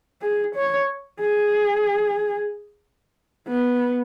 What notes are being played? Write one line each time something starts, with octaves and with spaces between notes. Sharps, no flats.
G#4
C#5
G#4
B3